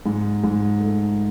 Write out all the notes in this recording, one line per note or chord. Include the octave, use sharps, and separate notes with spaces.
G#2
G#2
A3